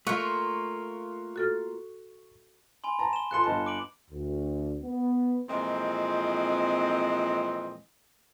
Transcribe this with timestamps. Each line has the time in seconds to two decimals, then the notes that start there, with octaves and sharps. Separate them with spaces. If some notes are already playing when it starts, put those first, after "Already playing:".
0.07 A3 A#3 F4 C#6 F#6 C#7
1.36 F#4 A4 F6
2.84 G#5 B5 C6
2.99 A5 A#5
3.13 E7 G7
3.31 F4 A4 C6 F#6 C#7 G7
3.44 G1 D#5 A5
3.66 D6 D7 F#7
4.11 D2
4.83 B3
5.48 F2 A#2 E3 G#3 C4 D#5